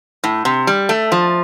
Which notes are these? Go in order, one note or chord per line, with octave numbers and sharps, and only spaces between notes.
A2
C3
G3
A3
F3